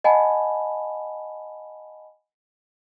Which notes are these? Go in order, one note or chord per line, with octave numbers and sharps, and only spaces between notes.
D#5 F#5 G#5 A5 B5